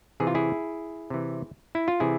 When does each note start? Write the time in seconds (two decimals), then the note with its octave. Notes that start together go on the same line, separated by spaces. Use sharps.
0.20 C3 E3 G#4
0.27 F4
0.35 E4 G#4
1.10 C3 E3
1.75 E4
1.88 F4
2.00 C3 E3 E4 G#4